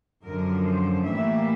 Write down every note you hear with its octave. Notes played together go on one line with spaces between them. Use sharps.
F#2 D3 F3 A#4
C5
A2 E3 G3 A#3 E5